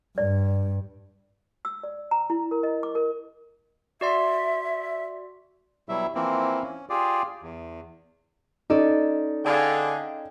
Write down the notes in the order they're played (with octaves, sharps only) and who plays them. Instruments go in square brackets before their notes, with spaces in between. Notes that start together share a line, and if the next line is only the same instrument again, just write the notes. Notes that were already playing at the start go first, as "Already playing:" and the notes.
[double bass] G2 [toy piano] D5
[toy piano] E6
D5
A#5
E4
A#4
D#5
D6
A#4
[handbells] F#4 D5 C6 [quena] E5
[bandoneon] B2 F#3 G3 E4 E5
E3 F3 A#3 C4 E4
C#4
F4 G4 G#4 D5
E2
[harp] C#4 A4 D5 [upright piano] D#4
[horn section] D3 G#4 [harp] F5 G5